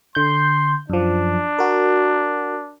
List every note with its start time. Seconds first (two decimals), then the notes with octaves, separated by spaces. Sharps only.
0.15 D3 C6 G6
0.90 F#2 F3 D4
1.59 F#4 A#4